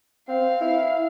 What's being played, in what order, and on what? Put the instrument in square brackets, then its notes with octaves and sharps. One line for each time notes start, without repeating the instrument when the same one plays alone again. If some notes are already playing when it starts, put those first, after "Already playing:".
[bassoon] C4 [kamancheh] F5
[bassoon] E4